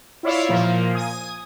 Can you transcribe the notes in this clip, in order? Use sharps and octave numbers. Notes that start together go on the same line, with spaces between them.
E4 F4 C#5 D5 E5 F5
A#2 F3 A#3
G#5 D#6